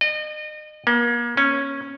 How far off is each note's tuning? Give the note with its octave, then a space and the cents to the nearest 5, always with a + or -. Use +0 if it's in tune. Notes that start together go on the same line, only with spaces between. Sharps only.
D#5 -35
A#3 +35
C#4 -10